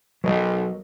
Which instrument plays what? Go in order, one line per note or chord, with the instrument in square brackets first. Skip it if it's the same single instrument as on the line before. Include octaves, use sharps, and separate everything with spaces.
[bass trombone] B1 [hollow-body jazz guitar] F#3 A#4 D#5